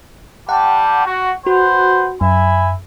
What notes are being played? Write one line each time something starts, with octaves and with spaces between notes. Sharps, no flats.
G3 G4 F#5 A5
F#4
F#4 B4 C5 F#5
F#2 E5 G#5 B5